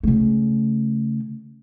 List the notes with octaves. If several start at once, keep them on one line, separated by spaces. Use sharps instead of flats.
C#3 A3